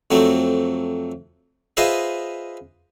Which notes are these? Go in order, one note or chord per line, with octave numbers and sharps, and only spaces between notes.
F2 F#3 A3 C4
F4 G#4 B4 C5 D#5 E5